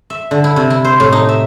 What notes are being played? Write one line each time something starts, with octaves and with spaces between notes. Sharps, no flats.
E5
D3
E4
C3
E4
C5
A2
D#4
E5